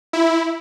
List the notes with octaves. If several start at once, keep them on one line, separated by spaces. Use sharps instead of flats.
E4